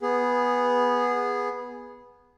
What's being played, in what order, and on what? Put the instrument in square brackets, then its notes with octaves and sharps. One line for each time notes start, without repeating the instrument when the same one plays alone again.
[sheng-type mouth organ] B3 G#4